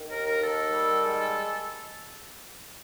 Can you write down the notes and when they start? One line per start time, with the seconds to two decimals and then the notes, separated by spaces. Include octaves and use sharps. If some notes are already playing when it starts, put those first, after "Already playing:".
Already playing: D#3
0.08 D#2 A#4
0.25 A#4
0.40 D#3 A4
0.72 G3
1.03 G#3